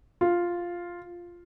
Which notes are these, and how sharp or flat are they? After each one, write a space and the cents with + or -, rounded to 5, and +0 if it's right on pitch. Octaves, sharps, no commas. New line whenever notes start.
F4 +0